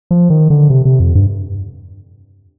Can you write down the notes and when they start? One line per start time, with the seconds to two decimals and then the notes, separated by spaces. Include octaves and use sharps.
0.11 F3
0.30 D#3
0.50 D3
0.70 C3
0.85 C3
1.00 F2
1.15 G2